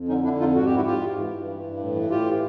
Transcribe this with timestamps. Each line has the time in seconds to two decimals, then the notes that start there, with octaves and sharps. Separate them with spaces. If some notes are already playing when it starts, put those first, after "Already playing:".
Already playing: F2
0.08 D3 C#4 D#4
0.24 D3 D4 E4
0.39 F2 D#4 F4
0.55 G#2 F#4
0.65 G#2 G4
0.76 E4 F#4
0.86 G#2 F4 G4
1.02 G#2
1.17 E3
1.33 G2
1.48 E3
1.64 G2
1.79 A2
1.95 E3
2.10 A2 F4 G4
2.26 E3